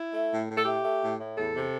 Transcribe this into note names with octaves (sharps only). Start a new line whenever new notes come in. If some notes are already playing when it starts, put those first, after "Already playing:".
Already playing: E4
A3
A2
A2
A4
A3 G4
A3
A2
A2
E2 A4
C3